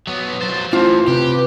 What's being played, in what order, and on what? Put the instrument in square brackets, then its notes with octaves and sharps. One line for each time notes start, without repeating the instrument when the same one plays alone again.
[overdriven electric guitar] F#3 B3
[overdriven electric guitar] F#3 C5 [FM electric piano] A6
[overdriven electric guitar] A2 E3 [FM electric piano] E4 [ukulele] F4 [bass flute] C5
[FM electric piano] C3 [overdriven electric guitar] G4 [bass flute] B4